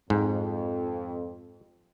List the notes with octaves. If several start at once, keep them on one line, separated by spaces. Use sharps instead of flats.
F2 G#2